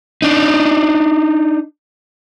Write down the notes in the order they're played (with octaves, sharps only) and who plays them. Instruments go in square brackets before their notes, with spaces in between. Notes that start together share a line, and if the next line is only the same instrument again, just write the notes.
[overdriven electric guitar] D4 D#4